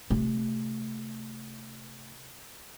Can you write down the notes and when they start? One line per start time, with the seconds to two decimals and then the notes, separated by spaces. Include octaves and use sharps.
0.10 C3 A3